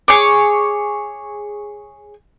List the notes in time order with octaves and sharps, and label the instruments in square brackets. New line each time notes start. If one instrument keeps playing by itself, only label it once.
[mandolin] G#4 C#5 D6